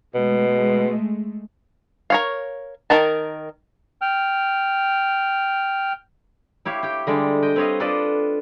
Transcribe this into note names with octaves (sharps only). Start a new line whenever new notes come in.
B2 G#3 A3
A#4 C#5 F5
D#3 A#4 A5
G5 F6
E4 G4 C#5 F5
G4 G5
D3 G3 G#3 D5
D#5 G5
C4 B4 C#5 D#5 F5
D4 F4 A4 B4 D5 D#5